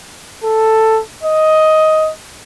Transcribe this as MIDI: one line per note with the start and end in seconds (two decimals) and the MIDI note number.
0.44 1.01 69
1.23 2.12 75